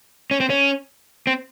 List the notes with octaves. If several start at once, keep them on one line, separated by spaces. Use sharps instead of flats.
C#4
C4
C#4
C4